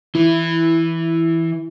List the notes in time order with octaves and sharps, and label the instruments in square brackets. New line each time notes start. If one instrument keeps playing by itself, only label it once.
[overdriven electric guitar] E3 [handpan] E4